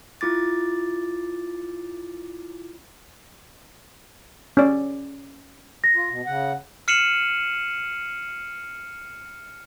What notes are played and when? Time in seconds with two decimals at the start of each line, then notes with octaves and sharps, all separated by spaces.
0.21 E4 F4 D6 A6
4.57 C#4 D5
5.84 A#6
5.95 F4
6.10 B2
6.26 C#3 F#5
6.88 F6 C7 C#7 D#7 E7 F#7